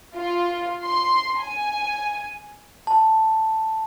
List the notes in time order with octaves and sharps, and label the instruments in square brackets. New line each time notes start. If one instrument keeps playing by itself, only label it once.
[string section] F4
C6
G#5
[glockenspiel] A5